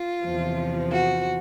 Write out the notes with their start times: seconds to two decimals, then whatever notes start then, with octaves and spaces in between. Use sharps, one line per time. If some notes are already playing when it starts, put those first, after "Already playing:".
Already playing: F4
0.24 E2 C3 F3
0.91 F#4